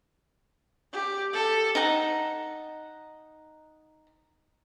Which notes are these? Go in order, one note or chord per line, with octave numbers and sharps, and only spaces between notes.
G4
A4
D#4 F#5